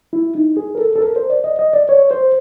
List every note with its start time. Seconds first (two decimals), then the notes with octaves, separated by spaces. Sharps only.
0.13 E4
0.35 D#4
0.57 G#4
0.75 A#4
0.79 A4
0.96 A4
1.01 A#4
1.16 C5
1.30 D5
1.44 D#5
1.59 D#5
1.73 D5
1.89 C#5
2.11 C5